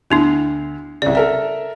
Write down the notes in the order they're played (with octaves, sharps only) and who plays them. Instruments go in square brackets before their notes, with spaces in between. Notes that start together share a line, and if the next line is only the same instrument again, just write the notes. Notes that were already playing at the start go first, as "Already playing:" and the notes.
[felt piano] D2 [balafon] B3 D4 E4
[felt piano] C2 C#3 [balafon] D5
[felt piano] A4 A#4 E5